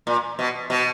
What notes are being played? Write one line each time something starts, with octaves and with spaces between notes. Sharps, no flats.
A#2
B2
B2